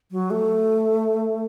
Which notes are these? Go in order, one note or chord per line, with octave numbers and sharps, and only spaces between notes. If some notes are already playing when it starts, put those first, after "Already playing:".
F#3
A3